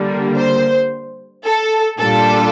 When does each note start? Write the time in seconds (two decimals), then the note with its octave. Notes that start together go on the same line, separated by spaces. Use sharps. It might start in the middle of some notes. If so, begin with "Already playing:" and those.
Already playing: D3 G3 A#3
0.36 C5
1.45 A4
1.99 A#2 G3 D4 F4 A4